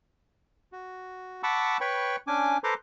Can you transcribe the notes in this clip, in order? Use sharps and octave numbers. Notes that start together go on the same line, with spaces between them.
F#4
F#5 A5 B5 C#6 D6 E6
B4 C#5 G5 B5 C#6
C#4 D4 G#5 D6
A4 B4 C5 A#5 C6 D6